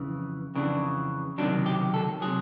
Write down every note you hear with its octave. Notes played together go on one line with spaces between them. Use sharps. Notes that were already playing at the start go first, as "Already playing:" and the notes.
Already playing: F2 C#3 E3
F2 C#3 E3 D4
C#2 C3 D#3 F#3 D4
G4
A4
C3 D#3 F#3 G#4